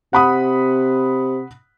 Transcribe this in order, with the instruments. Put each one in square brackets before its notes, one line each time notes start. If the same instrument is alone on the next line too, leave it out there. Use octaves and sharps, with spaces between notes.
[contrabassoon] C3 [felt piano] F#5 B5 D#6